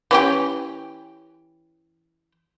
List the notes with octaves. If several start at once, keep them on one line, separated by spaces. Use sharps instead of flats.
E3 C#4 G4